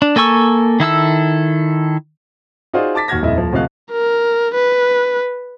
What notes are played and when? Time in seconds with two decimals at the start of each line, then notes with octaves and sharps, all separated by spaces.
0.02 D4
0.16 A#3 A4 G#5 C#6 E6
0.80 D#3 E4 A4 E6
2.73 D#4 F4 F#4 G#4 C5 D5
2.95 A5 D6 A6 B6
3.08 D#2 F#4 F6 G#6 A#6
3.22 D#1 F2 E4 D#5 E5
3.36 D#1 F3
3.52 D2 C3 F3 D#5 F5 F#6
3.92 A#4
4.55 B4